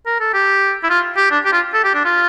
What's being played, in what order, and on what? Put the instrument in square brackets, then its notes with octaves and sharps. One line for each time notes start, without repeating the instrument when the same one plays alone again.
[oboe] A#4
A4
G4
E4
F4
G4
D4
G4
F4
A4
G4
D4
F4